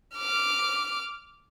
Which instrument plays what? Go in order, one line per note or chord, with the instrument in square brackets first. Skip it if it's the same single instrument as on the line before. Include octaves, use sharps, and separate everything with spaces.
[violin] D6 F6